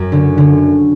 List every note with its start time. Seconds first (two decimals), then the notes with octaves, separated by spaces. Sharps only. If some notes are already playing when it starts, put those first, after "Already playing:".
Already playing: F#2
0.12 D3
0.38 D3